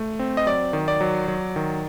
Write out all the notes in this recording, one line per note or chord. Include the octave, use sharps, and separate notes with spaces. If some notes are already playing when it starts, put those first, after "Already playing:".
Already playing: A3
C4
D#5
F#3 D5
D#3
D5
F#3
F#3
D#3